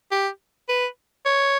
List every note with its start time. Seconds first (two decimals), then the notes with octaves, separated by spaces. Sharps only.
0.11 G4
0.69 B4
1.25 C#5